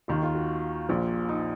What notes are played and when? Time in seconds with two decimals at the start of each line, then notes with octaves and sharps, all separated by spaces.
0.08 D#2 D#3 F4
0.23 F4
0.35 F#4
0.89 A#1 A#2 F3
1.29 D#4